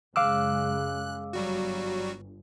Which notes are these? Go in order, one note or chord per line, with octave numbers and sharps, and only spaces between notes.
F#2 C#3 G#3 F5 D6 E6 F#6
G1 F#3 G3 F#4